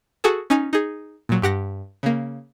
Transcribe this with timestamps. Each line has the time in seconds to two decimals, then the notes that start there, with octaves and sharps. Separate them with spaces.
0.24 F#4 G#4 A4
0.50 C#4 D#4 G#5
0.73 D#4 G#4
1.29 A#2 F#3
1.42 G2 G4 F#5 A#6
2.03 C#3 A#3